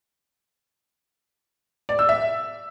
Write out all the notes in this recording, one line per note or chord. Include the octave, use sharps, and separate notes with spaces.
D5
E6
E5